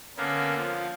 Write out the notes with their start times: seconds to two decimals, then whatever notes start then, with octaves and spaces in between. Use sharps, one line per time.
0.17 D3 A#3 B3 C#4
0.57 F3